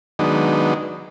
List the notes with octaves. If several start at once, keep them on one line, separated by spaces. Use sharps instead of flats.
D#3 F#3 G#3 B3 D4 D#4